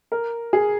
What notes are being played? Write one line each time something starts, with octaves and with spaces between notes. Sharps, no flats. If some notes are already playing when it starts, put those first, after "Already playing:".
A#4
G#4